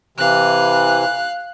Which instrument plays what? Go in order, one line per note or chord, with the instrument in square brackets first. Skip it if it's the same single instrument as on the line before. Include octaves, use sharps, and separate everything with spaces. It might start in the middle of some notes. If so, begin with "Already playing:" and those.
[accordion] C3 E3 [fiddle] F5 F#6